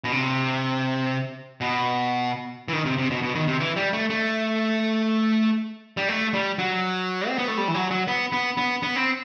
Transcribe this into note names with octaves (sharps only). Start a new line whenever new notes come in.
B2
C3
B2
E3
D#3
C3
C3
B2
B2
D#3
C3
E3
G3
A3
A3
G3
A3
G3
F#3
C4
B3
A3
G3
E3
F#3
F#3
B3
B3
B3
B3
C4